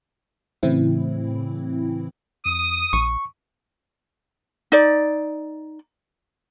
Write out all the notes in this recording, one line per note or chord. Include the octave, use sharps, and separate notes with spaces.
A2 C#3 E3 C4 E4
F2 D#6
A#1 C#6
D#4 D5